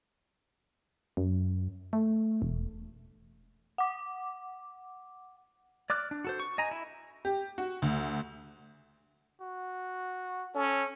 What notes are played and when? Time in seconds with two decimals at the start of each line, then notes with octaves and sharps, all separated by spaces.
1.17 F#2
1.93 A3
2.42 E1
3.78 F#5 D6
5.90 D5 D6 F6 F#6
6.11 D4
6.25 F#4 A4 C5
6.40 C#6
6.58 D#5 G#5 A#5
6.71 E4
7.25 G4
7.58 F#4
7.82 D2
9.41 F#4
10.55 C#4 A4